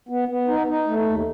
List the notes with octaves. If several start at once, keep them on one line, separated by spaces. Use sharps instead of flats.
B3
B3
D#4
D#4
A3
D#2